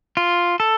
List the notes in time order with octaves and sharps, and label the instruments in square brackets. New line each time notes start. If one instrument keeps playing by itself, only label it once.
[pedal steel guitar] F4
A4